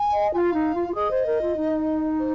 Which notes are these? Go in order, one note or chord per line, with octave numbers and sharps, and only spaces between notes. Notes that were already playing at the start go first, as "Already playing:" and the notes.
Already playing: G#5
D#5
F4 F5 G#5
D#4
F4
F4
G#4 D#5
C5
A#4
F4
D#4
C5